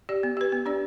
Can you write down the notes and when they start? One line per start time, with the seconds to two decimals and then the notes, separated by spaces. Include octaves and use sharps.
0.09 G4 D5
0.23 B3
0.37 G4 B4
0.52 B3
0.66 D4 G4 D5